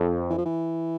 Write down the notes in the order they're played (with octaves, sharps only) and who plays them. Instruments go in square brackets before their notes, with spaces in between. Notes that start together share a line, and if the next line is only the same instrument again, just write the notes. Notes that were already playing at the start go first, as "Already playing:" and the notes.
Already playing: [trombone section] F2
[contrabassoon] E3
F3
E3